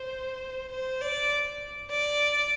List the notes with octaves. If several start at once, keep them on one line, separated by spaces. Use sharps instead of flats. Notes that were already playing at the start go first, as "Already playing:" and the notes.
Already playing: C5
C5
D5
D5